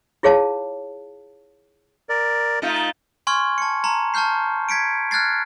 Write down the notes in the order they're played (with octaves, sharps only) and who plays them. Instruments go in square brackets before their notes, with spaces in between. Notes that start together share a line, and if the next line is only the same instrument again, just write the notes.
[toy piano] E4 F4 G#4 C#5 F5 A5
[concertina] A#4 D5
[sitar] A3 D#4 F4
[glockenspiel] G#5 C6 C#6 F6 G#6
A5 C#7
A5 A#5 C6
A5 C#6 F6 G6 C7
G#6 B6 C#7 D7
F6 F#6 G#6 A6 C7